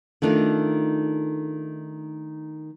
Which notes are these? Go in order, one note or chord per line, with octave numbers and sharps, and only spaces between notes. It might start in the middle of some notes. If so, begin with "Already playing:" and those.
D#3 A3 D4 D#4 F4